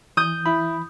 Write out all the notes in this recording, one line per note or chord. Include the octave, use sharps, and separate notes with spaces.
E3 D#6 G6
E4 B5